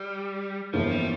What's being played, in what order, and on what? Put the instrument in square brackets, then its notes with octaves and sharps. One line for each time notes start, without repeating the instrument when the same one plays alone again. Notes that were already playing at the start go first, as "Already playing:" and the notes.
Already playing: [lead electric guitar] G3
[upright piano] G1 F2 E3 A#3 [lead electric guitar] F3
[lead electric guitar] G3